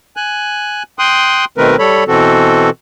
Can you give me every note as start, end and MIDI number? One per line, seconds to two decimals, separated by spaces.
0.17 0.83 80
0.17 0.83 90
0.99 1.45 79
0.99 1.45 84
0.99 1.45 87
0.99 1.45 90
1.58 1.76 47
1.58 1.76 51
1.58 1.76 57
1.58 1.76 60
1.58 1.76 70
1.58 1.76 71
1.79 2.04 55
1.79 2.04 69
1.79 2.04 73
1.79 2.04 83
2.08 2.70 47
2.08 2.70 52
2.08 2.70 60
2.08 2.70 66
2.08 2.70 69